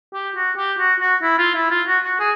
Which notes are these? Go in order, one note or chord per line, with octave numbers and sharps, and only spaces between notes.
G4
F#4
G4
F#4
F#4
E4
F4
E4
F4
F#4
F#4
G#4